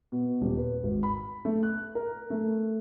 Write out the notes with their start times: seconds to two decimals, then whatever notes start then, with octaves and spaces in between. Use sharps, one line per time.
0.12 B2
0.41 D#1
0.57 B4
0.83 G#1
1.03 B5
1.45 A3
1.63 F#6
1.95 A#4
2.30 A3